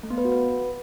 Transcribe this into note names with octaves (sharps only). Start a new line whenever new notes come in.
A3
B3
B4
F#4
B4